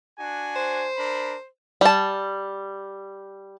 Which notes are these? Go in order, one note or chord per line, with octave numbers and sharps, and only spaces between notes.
D4 F#4 G#5
C5
D4 A#4 B5
G3 A5